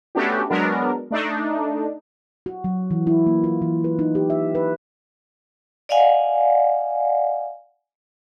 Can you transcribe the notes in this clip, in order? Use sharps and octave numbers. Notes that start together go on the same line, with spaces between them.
A3 B3 C#4 D4 F#4 G4
F#3 G#3 B3 D4 A#4
A3 D4 D#4
F#4
F#3
E3
E4
A#3
F4
E3
B4
D#4
G4
E5
B4
D5 D#5 F5 F#5 G#5